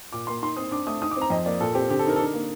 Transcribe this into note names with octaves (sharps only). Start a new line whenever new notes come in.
A#2 D6
A#3 C6
D#4 C6
C4 D#6
D4 D6
A3 D#6
D#4 D#6
D6
C4
A#5
F2 D#5
A#3 D5
A#2 A4
C4 G4
D3 G4
A4
D#4 A#4
A4
D4 A#4
A#3